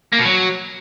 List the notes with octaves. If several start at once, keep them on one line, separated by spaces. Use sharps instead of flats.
A#3
B2
F#3